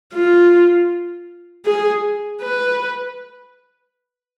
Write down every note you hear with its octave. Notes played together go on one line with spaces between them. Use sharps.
F4
G#4
B4